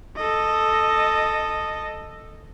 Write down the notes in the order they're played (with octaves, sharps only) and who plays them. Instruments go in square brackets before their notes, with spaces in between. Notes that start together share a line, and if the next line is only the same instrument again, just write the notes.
[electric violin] A4 D#5